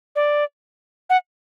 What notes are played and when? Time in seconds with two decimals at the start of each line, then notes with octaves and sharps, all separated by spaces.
0.16 D5
1.10 F#5